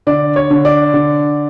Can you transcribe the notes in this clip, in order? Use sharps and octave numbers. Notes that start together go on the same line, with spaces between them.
D3 D5
C#5
D3
D5
D3